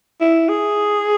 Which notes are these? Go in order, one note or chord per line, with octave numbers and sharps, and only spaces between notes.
E4
G#4